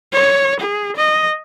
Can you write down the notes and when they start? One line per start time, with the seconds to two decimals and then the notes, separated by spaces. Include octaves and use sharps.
0.12 C#5
0.60 G#4
0.97 D#5